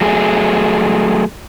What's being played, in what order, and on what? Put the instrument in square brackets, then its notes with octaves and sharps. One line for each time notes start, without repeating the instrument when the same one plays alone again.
[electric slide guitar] F#3 A3 G#4